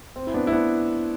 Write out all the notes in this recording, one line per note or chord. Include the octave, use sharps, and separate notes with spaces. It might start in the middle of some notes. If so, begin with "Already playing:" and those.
C4
E4
B3 D4
E4
B3 D4